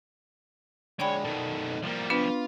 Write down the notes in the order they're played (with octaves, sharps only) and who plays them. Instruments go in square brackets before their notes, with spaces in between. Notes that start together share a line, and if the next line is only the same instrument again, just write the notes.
[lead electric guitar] D3 G#3 [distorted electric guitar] C#5 [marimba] D5 G5 B5
[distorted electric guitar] B2 D#3 [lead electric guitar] D#4 A4
[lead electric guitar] C2 A#3 [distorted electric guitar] F3 G3
[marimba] B3 D4 B4 [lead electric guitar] F4